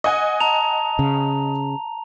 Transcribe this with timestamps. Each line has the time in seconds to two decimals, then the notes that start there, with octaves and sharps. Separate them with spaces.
0.04 D#5 F#5 G#5
0.40 A5 A#5 F7
0.99 C#3